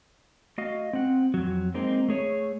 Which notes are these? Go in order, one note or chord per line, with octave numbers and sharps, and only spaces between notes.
A3 F#4 D#5 F5
C4 F#5
F2 F#3
G#3 A#3 C4 D#4
A3 G#4 C#5